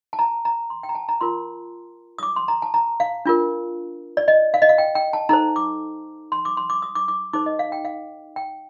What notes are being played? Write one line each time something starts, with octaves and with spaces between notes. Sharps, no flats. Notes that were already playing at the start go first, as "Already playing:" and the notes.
A5
A#5
A#5
C6
G5
A#5
A5
A#5
F4 A#4 C6
D#6
D6
C6
A#5
A5
A#5
F5
D4 F4 A#4
D5
D#5
F5
D#5
F5
G5
G5
A5
D#4 A4 C5 A#5
D6
C6
D6
C6
D6
D#6
D6
D6
D#4 A4 C5 D6
D#5
F5
G5
F5
G5